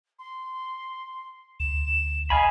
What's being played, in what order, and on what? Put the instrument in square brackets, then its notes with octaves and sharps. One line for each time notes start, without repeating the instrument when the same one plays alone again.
[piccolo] C6
[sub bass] D2 [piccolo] E7
[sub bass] A#1 [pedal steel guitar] D#5 G#5 B5 [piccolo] F5